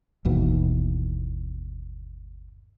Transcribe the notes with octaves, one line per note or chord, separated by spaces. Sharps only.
G1 D#2 B2 E3